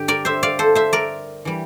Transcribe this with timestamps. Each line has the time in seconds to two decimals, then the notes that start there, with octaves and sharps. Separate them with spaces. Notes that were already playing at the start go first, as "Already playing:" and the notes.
Already playing: G2 D3 G4
0.08 A#4 D5
0.25 C5 E5
0.43 D5 F5
0.59 A4 C5
0.75 C5 E5
0.93 A#4 D5
1.45 E3 G3